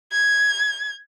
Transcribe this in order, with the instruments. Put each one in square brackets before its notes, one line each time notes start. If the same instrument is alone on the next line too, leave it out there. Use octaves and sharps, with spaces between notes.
[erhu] G#6